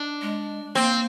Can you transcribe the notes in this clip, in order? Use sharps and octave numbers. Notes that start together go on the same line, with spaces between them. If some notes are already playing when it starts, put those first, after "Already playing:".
Already playing: D4
G#3
A#3 C4